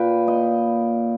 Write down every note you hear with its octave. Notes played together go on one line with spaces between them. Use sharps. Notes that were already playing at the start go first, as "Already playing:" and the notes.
Already playing: A#2 B4 G5
A#2 D#5